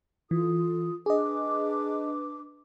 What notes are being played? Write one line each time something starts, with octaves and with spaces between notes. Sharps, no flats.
E3 F4 A4 D#6
D4 G#4 B4 D#5 D6